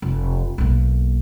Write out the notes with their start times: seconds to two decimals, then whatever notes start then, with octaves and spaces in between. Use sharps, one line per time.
0.02 F1
0.58 B1 A#3